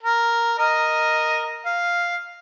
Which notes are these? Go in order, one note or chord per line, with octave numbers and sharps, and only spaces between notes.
A#4
A#4 D#5
F5